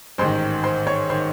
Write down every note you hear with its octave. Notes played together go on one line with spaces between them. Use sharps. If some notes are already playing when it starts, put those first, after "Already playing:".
A1 G#2 D#3 C5 C6
C5 C6
C#5 C#6
D#3 C5 C6